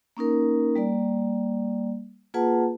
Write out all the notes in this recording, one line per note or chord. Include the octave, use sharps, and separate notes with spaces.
A#3 C#4 D#4 A#4
G3 A#3 D5
A#3 F4 G#4 B4 F#5 A5